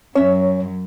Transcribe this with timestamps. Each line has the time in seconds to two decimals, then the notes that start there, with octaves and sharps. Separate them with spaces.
0.15 F#2 C#4 C#5 E5